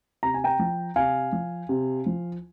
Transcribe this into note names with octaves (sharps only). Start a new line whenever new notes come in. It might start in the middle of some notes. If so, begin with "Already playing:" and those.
C3 A#5
G#5
G5 A#5
F3
C3 F5 G#5
F3
C3
F3